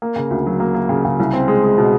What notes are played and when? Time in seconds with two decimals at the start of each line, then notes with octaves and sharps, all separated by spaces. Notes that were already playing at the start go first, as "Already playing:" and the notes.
0.02 A#3
0.16 C#3
0.31 D2
0.46 F#3
0.60 A#3
0.75 A#3
0.89 C#3
1.05 C#3
1.20 C2
1.33 C4
1.48 G#3
1.63 G#3
1.78 B2